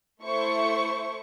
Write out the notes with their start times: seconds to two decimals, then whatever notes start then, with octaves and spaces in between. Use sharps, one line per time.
0.24 A3 E4 C5 C#6